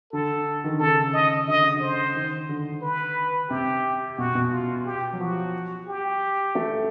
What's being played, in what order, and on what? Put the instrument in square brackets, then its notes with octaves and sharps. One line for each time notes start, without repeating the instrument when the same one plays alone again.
[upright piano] D3 [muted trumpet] A4
[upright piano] D#3
D3
[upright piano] C#3 [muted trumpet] A4
[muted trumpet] D#5
[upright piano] D3 [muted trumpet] D#5
[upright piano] C#3
D3
[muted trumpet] C5
[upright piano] D#3
D3
[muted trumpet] B4
[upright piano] C3 [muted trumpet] G4
[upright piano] B2 [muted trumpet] F#4
[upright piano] B2
[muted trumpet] F4
G4
[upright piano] F#3
[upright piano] F3 [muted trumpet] F#4
[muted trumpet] G4
[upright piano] A3